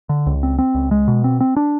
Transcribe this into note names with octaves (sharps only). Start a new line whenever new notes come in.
D3
C#2
C4
C4
C#2
G#3
B2
C4
C4
D4